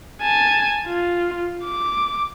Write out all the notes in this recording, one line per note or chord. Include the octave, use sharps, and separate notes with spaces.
G#5 A5
F4
D6